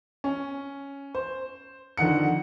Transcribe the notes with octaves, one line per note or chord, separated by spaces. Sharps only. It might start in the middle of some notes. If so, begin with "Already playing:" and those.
C#4
C5
F2 D3 D#3 F#5 C#7